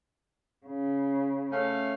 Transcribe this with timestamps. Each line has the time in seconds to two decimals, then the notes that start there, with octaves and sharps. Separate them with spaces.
0.66 C#3
1.52 A3 C#4 F5